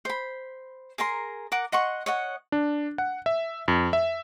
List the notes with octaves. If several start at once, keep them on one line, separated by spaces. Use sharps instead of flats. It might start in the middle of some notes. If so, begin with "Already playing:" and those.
C5 B5
G#4 A#4 A#5 C6
A#4 F#5 D6
D#5 F#5 C6 C#6
C#5 D#5 F#5
D4
F#5
E5
F2
E5